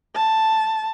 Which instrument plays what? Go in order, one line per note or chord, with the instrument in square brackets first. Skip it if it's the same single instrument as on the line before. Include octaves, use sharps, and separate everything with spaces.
[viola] A5